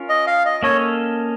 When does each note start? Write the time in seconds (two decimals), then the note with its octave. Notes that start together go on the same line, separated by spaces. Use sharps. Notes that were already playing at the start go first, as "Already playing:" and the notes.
Already playing: C#4 F4 A#4
0.09 D#5
0.27 F5
0.45 D#5
0.63 A#3 C#4 A4 C#5 D#5